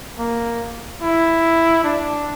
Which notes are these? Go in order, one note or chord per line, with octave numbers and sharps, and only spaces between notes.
A#3
E4
D4